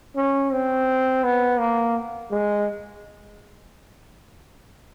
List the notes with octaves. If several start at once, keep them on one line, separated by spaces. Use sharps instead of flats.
C#4
C4
B3
A#3
G#3